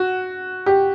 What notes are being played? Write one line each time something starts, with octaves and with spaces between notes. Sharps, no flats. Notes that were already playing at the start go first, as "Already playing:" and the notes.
Already playing: F#4
G4